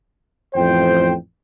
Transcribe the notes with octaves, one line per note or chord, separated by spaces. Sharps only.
A1 F2 C5 G5